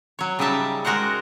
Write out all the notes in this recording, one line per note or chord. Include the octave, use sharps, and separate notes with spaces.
F#3 C#5
C#3 G3 D#4 E5 A5
G#3 F#4 A#4 C5 F#5